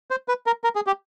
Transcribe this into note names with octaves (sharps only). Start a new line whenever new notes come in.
C5
B4
A#4
A#4
G#4
G4